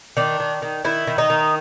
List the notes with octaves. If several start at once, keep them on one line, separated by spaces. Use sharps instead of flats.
D#3 D4
D#3
D#3
D#3 E4
D#3
D#4
D#3